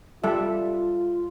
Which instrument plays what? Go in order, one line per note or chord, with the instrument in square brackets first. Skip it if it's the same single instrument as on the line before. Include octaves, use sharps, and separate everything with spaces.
[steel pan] G3 A4 E5 [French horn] F4